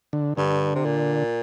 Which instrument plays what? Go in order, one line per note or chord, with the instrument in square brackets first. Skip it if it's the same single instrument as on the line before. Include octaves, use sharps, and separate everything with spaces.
[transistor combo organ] D3
[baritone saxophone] G2 [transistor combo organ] D3
[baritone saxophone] C3
A#2